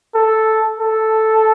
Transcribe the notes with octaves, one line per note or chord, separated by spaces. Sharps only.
A4
A4